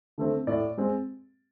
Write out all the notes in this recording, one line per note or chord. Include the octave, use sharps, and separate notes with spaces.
D3 A3 C4
A2 D5
G#3 C4